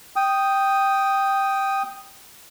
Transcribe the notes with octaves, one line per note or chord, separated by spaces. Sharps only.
G5 D#6